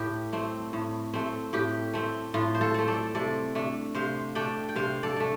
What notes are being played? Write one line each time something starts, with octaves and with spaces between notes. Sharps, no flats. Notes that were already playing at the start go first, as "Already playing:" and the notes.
Already playing: A2 G4
A3 C4
A2
A3 C4
A2 G4
A3 C4
A2 F4
C5
F4 A4
A3 C4
A4 D5
C3 A4 D5
A3 D4
C3 C5 F5
A3 D4 D5 G5
G5
C3 C5 F5
A4 D5
A3 D4